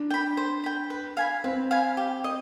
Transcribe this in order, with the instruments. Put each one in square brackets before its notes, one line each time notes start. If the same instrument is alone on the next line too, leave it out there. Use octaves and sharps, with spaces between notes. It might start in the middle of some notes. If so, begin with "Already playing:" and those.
Already playing: [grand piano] D4
[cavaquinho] G5 B5
C5
G5 B5
B4
F5 G#5 B5
[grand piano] C4 [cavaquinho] B4
[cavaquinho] F5 G#5 B5
G4
D#5